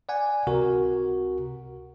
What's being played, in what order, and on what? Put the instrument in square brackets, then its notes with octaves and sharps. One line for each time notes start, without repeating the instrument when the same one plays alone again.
[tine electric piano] D5 F#5 G#5
C#2 C3 F#4 A#4